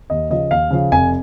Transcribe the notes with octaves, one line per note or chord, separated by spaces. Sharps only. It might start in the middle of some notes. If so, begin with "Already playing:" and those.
D#2 D#5
C#3 F3 D#5
D#2 F5
C#3 F3
F1 G#5